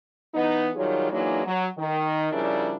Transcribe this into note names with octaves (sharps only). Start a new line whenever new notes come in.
E3 B3 D#4
D#3 F#3 G3 F4 G#4 C#5
E3 F#3 G#3 A#3 D4 D#4
F#3
D#3
C#3 F3 G3 D4 E4 A#4